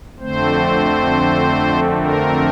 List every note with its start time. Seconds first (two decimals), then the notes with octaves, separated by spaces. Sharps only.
0.19 F2 D3 A3 C4 C5
1.97 A#4